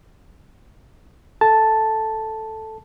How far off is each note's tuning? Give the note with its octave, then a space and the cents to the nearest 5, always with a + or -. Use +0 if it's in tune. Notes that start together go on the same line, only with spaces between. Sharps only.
A4 +0 A5 +0